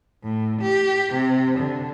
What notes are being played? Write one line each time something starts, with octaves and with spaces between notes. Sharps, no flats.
A2
G4
C3
D3